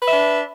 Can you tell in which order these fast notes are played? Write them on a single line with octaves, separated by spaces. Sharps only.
B4 E5 D4